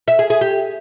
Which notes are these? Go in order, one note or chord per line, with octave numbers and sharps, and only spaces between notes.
E5
G#4
G#4
G4